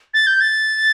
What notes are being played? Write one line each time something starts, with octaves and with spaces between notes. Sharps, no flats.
A6
G6
A6